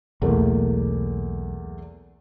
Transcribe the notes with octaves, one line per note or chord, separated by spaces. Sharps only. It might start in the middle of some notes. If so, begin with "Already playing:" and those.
B1 E2 A3 A#3